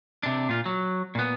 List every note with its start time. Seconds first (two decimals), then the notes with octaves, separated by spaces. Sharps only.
0.23 C3 D4
0.49 A#2 F4
0.66 F#3
1.15 A#2 B3